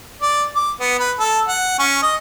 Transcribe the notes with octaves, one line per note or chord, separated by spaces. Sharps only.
D5
D6
B3
B4
A4
F#5
C#4
D#5